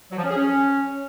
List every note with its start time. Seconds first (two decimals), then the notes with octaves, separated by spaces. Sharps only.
0.11 F#3
0.17 F3
0.24 C#4
0.30 G#4
0.36 C#4